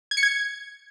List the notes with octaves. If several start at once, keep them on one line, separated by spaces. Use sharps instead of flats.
G#6
C#7
G#6